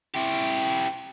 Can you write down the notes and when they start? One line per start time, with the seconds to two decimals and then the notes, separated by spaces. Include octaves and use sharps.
0.14 E4 G4